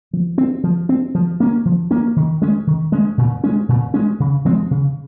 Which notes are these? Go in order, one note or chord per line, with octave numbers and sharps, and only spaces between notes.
F3
C4
F3
C4
F3
A#3 C#4
F3
A#3 C#4
D#3
G#3 C#4
D#3
G#3 C#4
A#2
G#3 C#4
A#2
G#3 C#4
C#3
F3 G#3 C4
C#3